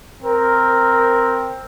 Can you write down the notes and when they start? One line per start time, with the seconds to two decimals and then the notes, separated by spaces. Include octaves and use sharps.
0.22 C4 A#4